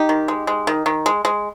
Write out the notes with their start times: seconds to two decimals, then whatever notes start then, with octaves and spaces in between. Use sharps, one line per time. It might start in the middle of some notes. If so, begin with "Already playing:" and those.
Already playing: D#4 G4
0.09 D#3
0.28 G#3
0.47 G#3
0.67 D#3
0.86 D#3
1.06 G#3
1.25 G#3